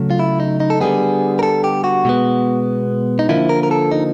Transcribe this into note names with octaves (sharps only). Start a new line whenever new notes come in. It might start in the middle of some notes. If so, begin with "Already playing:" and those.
Already playing: C#3 F#3 A3
F4
E4
D#4
D#4
A4
D3 G3 B3 G#4
A#4
A4
G4
F#4
B2 G#3 B3
D#4
D3 F3 A#3 E4
A#4
A#4
A4
D#4